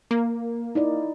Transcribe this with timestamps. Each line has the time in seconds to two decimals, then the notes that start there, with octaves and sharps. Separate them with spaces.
0.11 A#3
0.75 D#4 E4 D5